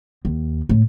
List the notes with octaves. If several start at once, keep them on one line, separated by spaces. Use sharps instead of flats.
D#2
A2